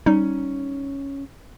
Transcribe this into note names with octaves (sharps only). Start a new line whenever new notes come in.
G3 C#4 D#4